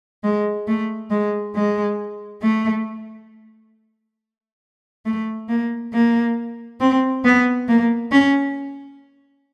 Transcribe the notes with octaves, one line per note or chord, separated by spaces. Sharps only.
G#3
A3
G#3
G#3
A3
A3
A#3
A#3
C4
B3
A#3
C#4